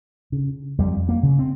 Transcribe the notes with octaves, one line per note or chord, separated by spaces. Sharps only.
C#3
F2 G3
A#3
C#3
C4